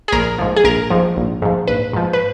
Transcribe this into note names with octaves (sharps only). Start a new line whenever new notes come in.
G#4
A#1 A#4
G#2 F3
G#4
A#1 A#4
G#2 F3
A#1
G#2 F3
A#1 B4
G#2 F3
B4